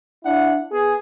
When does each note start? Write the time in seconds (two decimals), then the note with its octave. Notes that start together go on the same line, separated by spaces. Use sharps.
0.23 D4 E4 F#5
0.70 B3 G#4